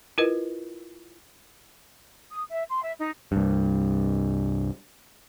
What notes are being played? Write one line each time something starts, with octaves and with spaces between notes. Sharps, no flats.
E4 F4 A#4 B4 D#5
D#6
E5
C6
E5
D#4
C2 G2